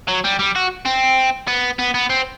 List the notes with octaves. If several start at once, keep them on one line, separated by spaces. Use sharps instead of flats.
F#3
G3
G3
F#4
C4
B3
B3
B3
C4